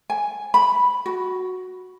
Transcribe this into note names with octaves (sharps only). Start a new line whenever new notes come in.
G#5
B5
F#4